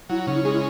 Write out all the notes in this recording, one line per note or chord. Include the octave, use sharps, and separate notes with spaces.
F#3 E4
C#3 D#4
E4
G#3 G#4
E4